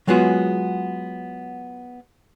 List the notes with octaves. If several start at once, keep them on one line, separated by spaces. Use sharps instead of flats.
F#3 G#3 B3 F4 F#4 G#4